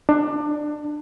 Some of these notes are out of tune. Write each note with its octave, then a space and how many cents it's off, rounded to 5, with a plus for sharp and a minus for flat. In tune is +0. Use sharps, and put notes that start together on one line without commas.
D4 +25